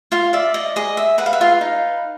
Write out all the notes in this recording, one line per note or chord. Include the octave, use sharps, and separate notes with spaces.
F4 F5
D5 E5
D#5
G#4 D#5
E5
B4 F#5
F5
E5
F4 F5
D#4